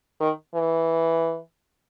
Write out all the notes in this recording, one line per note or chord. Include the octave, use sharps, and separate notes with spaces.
D#3
E3